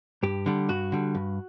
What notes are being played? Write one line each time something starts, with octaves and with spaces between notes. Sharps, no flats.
G2 G4
D3 G3
G2 F#4
D3 G3
G2